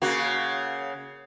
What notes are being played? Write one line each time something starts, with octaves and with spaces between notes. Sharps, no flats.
C#3 A#3 F#4